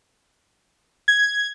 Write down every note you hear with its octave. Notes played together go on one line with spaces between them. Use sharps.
G#6